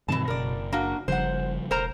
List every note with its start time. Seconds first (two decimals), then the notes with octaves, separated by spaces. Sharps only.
0.08 G2 B2 D#3 E3 C4 A5
0.28 F#1 A#4 D5
0.73 A#3 D4 F#4
1.08 F#1 C#3 F3 G3 C5 F#5
1.71 E1 A#4 C5 A#5